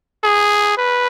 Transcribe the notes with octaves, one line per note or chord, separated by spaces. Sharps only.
G#4
B4